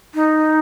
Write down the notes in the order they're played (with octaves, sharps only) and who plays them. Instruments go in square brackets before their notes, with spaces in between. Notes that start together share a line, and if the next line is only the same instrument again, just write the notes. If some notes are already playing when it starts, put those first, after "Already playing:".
[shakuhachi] D#4